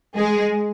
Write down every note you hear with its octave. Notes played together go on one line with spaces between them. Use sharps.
G#3 G#4